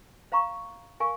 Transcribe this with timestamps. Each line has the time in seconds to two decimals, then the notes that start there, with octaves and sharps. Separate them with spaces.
0.32 C5 F5 A#5 C#6
1.00 A#4 F5 G#5 C#6